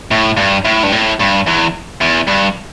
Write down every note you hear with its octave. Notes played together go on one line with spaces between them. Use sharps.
A2
G2
A2
G2
A2
G2
E2
E2
G2